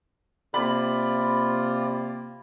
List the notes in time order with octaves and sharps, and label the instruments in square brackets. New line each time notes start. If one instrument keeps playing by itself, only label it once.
[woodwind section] C3 A#3 [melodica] F4 D5 [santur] B5